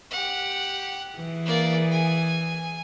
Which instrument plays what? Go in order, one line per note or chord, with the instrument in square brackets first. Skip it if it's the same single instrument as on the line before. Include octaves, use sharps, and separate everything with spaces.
[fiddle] G4 F#5
[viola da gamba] E3 G#4
[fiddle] A#3 D5
G#5